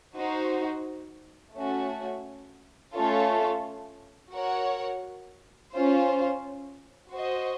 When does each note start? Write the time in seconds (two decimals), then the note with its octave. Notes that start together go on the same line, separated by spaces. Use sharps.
0.16 D#4 F#4 C5
1.55 A3 C#4 F#4
2.95 A3 C#4 F4 A4 C#5
4.34 F#4 A#4 C#5 F#5
5.73 C#4 F4 C5
7.13 F#4 C5 D#5